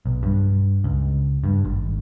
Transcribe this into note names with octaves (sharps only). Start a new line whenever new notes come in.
B1
G2
C#2
G2
G#1